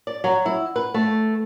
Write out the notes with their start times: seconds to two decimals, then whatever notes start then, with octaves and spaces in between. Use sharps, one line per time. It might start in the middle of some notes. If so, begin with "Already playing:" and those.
0.07 D5
0.24 F#3
0.46 E4
0.76 B4
0.94 A3